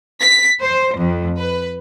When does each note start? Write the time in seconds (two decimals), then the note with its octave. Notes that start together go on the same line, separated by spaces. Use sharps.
0.20 B6
0.61 C5
0.98 F2
1.36 B4